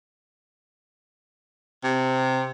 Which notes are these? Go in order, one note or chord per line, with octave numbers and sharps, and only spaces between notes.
C3